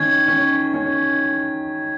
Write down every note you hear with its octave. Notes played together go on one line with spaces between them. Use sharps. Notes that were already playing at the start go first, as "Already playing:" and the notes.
Already playing: D#3 C#4 G#6
C#4
C#4